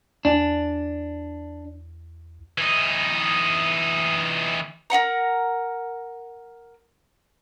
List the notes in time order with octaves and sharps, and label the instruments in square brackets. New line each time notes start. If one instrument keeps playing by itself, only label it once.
[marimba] E2 [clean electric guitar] D4
[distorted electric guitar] E3 D#4
[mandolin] A#4 D#5 F#5 A#5